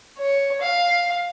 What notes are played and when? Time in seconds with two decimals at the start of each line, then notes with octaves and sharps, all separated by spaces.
0.18 C#5
0.61 F5